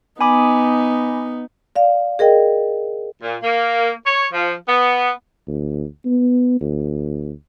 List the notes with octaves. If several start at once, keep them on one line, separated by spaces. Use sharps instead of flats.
B3 D#4 G#5 B5 D6
D5 F5
G#4 A#4 D#5 G5
A#2
A#3
C#5
F3
B3
D2
B3
D2